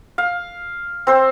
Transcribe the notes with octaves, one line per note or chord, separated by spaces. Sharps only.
F5
C4 C5